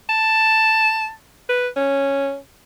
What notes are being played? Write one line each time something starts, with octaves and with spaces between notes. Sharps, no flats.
A5
B4
C#4